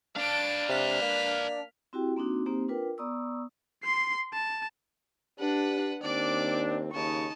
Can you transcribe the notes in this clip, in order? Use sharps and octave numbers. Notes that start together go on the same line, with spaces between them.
D4 B4 F5 A5 D7
C3 F6 B6
A#3
C4 E4 F#4 G4 G5
A#3 C4 D4 D#4 F#4
A#3 C4 D#4 G4 C5
D4 F4 A#4 B4 G5
B3 D5 A#5 C#6 D#6 E6
C6 C7
A5
D4 G4 B4 F#5
D#2 C4 D4 D5 D6
D#2 C#3 D#4 A5 C#6